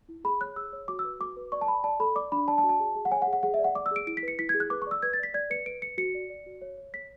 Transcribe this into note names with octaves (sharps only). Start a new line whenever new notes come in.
E4
G#4 B5
C#5 F#6
G#4 E6
C#5
F#4 D6
E6
B4
F#4 D6
B4
D5 C#6
A5
D5 B5
D5 A5
A4 B5
D5 D6
D4 B5
D5 A5
A5
F#4
A5
G#4
G#4
F#5
C#5 G#5
F#5
G#4
F#5
G#4 F#5
E5
D5
F#5
D5 D6
E6
G#4 D7
E4 D7
B6
B4 C#7
E4 B6
G#6
G#4
F#6
B4 D6
C#6
D5 E6
B4 G#6
A6
D5 B6
D5 G#6
B4 C#7
B4 D7
B4 C#7
F#4 C#7
D5
D5
F#4
C#5
C#5
C#5 B6